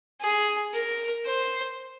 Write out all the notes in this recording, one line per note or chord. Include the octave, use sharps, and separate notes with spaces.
G#4
A#4
C5